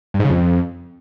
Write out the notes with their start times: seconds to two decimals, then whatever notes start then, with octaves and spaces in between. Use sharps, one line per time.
0.14 G2
0.19 G#2
0.25 C#3
0.30 F2